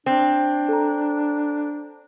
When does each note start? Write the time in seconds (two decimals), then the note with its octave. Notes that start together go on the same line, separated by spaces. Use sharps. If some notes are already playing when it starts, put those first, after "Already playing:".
0.06 C4 D4
0.69 A4 A#5